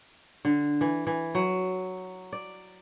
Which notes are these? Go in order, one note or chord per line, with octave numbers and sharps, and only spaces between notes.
D3
E3
E3
F#3
D5